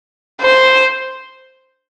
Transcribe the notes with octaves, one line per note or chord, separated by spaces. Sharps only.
C5